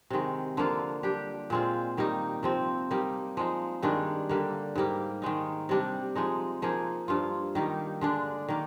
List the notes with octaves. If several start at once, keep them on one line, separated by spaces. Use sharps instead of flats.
C3 D#3 G#3
D3 F3 A#3 F4
G3 D4 G4
A#2 G#3 C4 F4
D#3 G3 A#3 D#4
C3 F3 C4
G3 A#3 D#4
F3 G#3 D#4
G2 D#3 G#3 D4
D3 G3 A#3
G#2 G3 A#3
D#3 G#3 D#4
C3 G3 D4
F3 G#3 D#4
F3 A#3 D#4 G#4
G2 F3 A#3 F4
D#3 G3 A#3 D#4
D3 G#3 D4
D#3 A#3